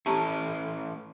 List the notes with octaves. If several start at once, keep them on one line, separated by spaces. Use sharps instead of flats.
A3 C#4 E4 G4 A5 A#5